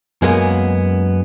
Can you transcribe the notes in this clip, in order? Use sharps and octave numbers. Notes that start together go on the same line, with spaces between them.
F#2 G#3 A#3 B3